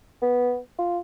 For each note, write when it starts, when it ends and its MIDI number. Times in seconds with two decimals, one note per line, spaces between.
0.22 0.58 59
0.79 0.99 65